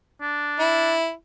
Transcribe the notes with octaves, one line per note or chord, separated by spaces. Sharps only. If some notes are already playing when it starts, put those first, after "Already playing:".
D4
E4